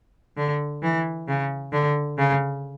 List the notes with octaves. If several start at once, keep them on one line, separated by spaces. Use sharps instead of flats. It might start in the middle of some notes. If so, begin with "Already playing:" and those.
D3
E3
C#3
D3
C#3